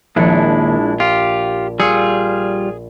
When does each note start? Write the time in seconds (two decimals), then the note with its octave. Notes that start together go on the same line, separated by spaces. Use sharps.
0.16 A#1 D#2 G#3 D4 E4 C#7
1.00 F4 G4
1.80 G3 F4 G#4 E6 C#7